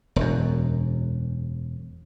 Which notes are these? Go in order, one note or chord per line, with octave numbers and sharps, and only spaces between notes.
E1 F#2